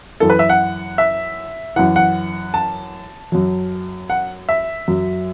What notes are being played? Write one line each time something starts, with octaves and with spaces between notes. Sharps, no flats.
F#2 E3 A4
B4
E5
F#5
E5
F#2 E3 F#5
F#5
A5
F#2 F#3
F#5
E5
F#2 F#3